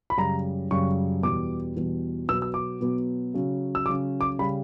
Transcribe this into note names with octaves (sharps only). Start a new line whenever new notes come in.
B5
F#2 C#3 G3 A#5
F#2 C#3 G3 C#6
E2 B2 G3 B3 D6
E2 B2 G3 B3
B2 F#3 B3 E6
E6
D6
B2 F#3 B3
C#3 F#3 C#4
E6
C#3 F#3 C#4 D6
D6
C#3 G3 B5